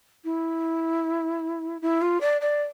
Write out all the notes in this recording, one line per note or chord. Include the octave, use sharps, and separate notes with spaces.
E4
E4
F4
D5
D5